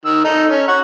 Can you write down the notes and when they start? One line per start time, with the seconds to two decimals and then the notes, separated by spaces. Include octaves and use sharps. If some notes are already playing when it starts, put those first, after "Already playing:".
0.05 D#3 E6
0.24 D#4 A4
0.50 C#4
0.68 F#5 C#6